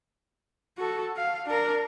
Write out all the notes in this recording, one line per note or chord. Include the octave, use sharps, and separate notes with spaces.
F#4 A4
F5
D4 A#4